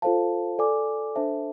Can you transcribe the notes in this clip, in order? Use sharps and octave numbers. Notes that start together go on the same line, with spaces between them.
F4 A4 C5 F5 A5
A4 D5 G#5 D6
D4 A4 C5 E5 A5